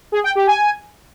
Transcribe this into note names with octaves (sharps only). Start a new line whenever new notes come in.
G#4
G5
G4
G#5